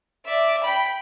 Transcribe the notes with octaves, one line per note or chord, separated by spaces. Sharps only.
D5 E5
G5 B5